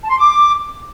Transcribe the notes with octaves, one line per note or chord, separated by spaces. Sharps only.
A5
C6
D6